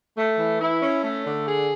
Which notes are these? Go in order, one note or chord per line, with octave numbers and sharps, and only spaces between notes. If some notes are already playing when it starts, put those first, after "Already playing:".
A3
E3
E4
C#4
A3
D3
G#4